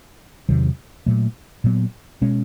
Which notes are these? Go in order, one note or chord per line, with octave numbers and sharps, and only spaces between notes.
E2 C3 D#3 F#3
A#2 F#3 A3
A#2 F#3 B3
B2 G#3 C#4